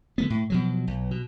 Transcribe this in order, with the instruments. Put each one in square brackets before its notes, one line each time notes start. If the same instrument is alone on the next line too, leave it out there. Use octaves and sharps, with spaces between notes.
[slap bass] D3 A#3 B3
A2
B2 F3 F#3
B1
B2